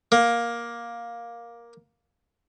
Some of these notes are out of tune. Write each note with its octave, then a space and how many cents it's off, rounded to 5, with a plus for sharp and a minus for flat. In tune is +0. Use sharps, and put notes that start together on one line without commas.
A#3 +10